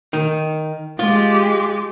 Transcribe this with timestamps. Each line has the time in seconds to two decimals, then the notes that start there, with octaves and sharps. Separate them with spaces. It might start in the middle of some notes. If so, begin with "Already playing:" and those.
0.13 D#3
0.99 G#3 F4 G4